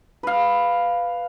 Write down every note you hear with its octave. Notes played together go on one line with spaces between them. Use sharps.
B4 F5